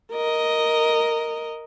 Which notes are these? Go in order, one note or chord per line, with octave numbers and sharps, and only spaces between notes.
A#4 D#5